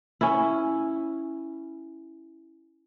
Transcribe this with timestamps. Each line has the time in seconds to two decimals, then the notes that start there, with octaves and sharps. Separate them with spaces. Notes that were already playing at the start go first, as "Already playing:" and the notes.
0.21 C#4 E4